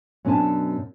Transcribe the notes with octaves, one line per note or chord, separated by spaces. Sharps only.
F#2 B2 C4 D4 G#5 A5